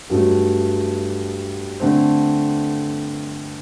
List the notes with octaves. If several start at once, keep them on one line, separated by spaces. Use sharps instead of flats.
G2 F#3 A3
D3 A3 C4